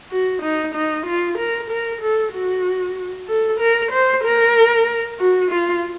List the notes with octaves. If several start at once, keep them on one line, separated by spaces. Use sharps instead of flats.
F#4
D#4
D#4
F4
A#4
A#4
A4
F#4
A4
A#4
C5
A#4
F#4
F4